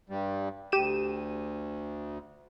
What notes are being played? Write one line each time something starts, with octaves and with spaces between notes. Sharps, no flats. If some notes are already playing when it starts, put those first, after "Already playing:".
G2 G3
D2 G4 D#7 E7